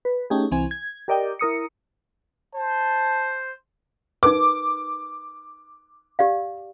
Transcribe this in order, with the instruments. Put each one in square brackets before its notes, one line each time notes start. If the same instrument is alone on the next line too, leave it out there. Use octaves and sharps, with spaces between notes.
[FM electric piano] B4
A3 C#4 D#4 G4 G#4
C2 E3 C4 G#5
G#6
G4 A#4 D5 D#5 G5
E4 A#4 D#6 C#7
[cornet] C5 [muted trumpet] A5
[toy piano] D#4 A#4 B4 [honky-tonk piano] D6
[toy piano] G4 D5 F5